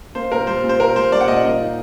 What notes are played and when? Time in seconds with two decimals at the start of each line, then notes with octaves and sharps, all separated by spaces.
0.15 A#3 C5
0.32 A#2 A#4
0.47 G3 C5
0.64 A#2
0.69 C5
0.80 A#3 A#4
0.96 A#2 C5
1.12 G3 D5
1.21 F#5
1.28 A#2 D#5
1.36 D5
1.44 A#3 D#5
1.60 D#4